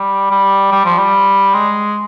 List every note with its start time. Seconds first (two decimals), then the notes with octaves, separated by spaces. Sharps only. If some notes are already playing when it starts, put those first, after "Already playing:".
Already playing: G3
0.31 G3
0.72 G3
0.85 F3
0.99 G3
1.54 G#3